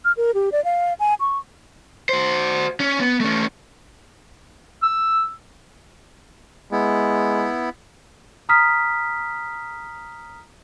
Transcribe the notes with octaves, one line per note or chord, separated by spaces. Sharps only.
F6
A#4
G4
D5
F5
G#5
C#6
F#4 C5
C#4
B3
A3 C#4
E6
G#3 B3 E4
A#5 D#6 F6 B6